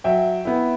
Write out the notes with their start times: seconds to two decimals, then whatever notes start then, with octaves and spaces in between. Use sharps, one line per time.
0.04 F#3 E5 G5
0.45 B3 E4